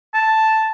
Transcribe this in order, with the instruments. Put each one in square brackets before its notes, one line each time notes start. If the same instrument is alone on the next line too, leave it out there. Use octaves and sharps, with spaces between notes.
[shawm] A5